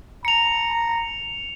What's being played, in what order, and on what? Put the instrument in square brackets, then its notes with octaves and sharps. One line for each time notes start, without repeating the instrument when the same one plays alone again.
[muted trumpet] A#5 [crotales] C#7 F7